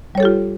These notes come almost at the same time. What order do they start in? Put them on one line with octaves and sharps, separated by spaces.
G3 C#5 A4 G4 F4